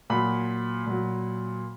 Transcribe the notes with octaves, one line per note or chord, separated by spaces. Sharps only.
A#2 F#3 B5
A#2 F#3